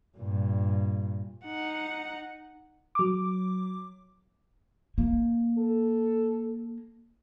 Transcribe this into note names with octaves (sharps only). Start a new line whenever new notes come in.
G2 A#2
D#4 F#5
F#3 D6
A#3
A4